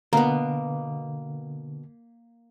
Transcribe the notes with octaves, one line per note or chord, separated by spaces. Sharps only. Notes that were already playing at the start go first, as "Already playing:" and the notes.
B2 D3 A#3 B3 A#5